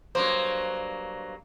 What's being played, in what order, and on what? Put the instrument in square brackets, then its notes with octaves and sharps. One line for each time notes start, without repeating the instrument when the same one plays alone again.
[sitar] G2 F#3 A#3 [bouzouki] C5